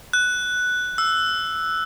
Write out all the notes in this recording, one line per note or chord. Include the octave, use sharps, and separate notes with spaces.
F#6
E6